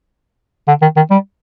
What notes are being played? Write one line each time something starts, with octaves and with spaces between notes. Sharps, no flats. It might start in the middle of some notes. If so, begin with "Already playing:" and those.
D3
D#3
D#3
G3